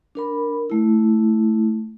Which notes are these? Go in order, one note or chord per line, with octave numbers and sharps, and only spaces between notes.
D4 A#4 B5
A3 E4